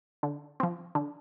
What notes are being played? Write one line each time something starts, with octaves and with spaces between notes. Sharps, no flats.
D3
F3 C4
D3